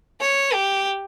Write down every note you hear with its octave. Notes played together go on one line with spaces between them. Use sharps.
C#5
G4